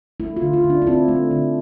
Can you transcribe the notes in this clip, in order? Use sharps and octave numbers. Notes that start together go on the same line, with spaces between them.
A3 E4
F4
D3
F4
D3
D4
D4
C4 E4
A3
D3